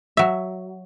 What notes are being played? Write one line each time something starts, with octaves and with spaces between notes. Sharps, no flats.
F#3 E5